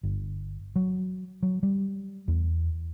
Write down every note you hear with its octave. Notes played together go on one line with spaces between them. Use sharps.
G1
F#3
F#3
G3
E2